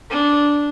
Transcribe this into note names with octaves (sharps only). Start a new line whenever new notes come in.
D4